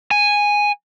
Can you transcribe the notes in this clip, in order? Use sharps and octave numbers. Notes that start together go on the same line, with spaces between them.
G#5